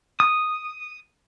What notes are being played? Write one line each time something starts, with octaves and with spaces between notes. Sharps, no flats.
D#6